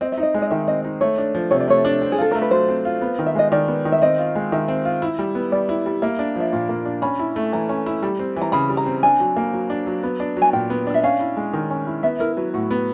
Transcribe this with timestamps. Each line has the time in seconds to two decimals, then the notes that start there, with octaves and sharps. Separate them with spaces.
0.01 C4 D#5
0.12 E5
0.18 D#4
0.23 D#5
0.34 G#3
0.42 D#5
0.50 D#3 E5
0.68 C4 D#5
0.84 D#4
1.01 A3 C#5
1.18 D4
1.35 F3
1.51 C3 C#5
1.60 D5
1.68 A3 C#5
1.85 D4
2.01 C4
2.12 G#4
2.18 F4 A4
2.31 A3 A#4
2.42 B4
2.51 F#3 C5
2.68 C4
2.85 F4
3.02 B3
3.19 D#3
3.27 E5
3.35 G#3 D#5
3.52 D#3 D5
3.68 B3
3.85 D#3
3.92 E5
4.02 C4 D#5
4.19 F4
4.35 G#3
4.52 D#3 E5
4.68 C4
4.85 F4
5.02 E4
5.19 G3
5.35 B3
5.52 G3 D5
5.69 E4
5.86 G3
6.02 A#3 E5
6.19 D4
6.36 F3 E5
6.53 A#2 F5
6.69 A#3
6.86 D4
7.02 C#4 B5
7.19 E4
7.36 A3
7.53 E3 A#5
7.69 C#4
7.86 E4
8.03 G3
8.19 C4
8.36 E3
8.42 A#5
8.52 C#3 B5
8.69 G3
8.77 A#5
8.86 C4
9.03 D4 G#5
9.20 F#3
9.36 A#3
9.53 F#3
9.70 D4
9.87 F#3
10.03 B3
10.20 D4
10.37 F#3
10.42 G#5
10.53 A#2 G5
10.70 B3
10.87 D4
10.94 E5
11.03 C#4 F5
11.20 E4
11.37 G#3
11.53 D#3
11.70 C#4
11.87 E4
12.03 B3 E5
12.20 E4 A#4
12.37 F#3 B4
12.54 A2 F#4
12.71 B3